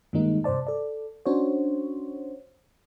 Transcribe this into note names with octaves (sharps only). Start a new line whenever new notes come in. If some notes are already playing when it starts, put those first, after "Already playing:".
G2 D#3 G3 G#3 A#3 D#4
G2 C3 C5 D5 A5
A4 D5
C#4 D4 F#4 C5 C#5